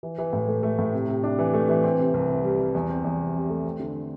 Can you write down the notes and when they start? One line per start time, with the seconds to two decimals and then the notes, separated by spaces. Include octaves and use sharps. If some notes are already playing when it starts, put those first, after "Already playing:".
0.03 E3
0.18 E3
0.33 A2
0.48 A3
0.63 A3
0.79 A2
0.94 C3
1.09 C3
1.24 D4
1.39 E3
1.54 A3
1.69 E3
1.84 C4
1.99 C3
2.14 C2
2.29 C3
2.44 G3
2.60 G3
2.75 E2
2.89 C4
3.04 E2
3.20 C3
3.35 C3
3.50 A3
3.65 C4
3.80 D3